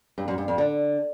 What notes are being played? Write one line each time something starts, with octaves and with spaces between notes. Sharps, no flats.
G2
F#2
G2
F2
D3